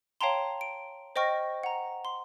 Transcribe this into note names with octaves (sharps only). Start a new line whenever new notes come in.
C#5 F5 G5 A5 A#5 C6
D7
C5 D#5 G5 C#6 F6 A#6
F#5 A#5
C6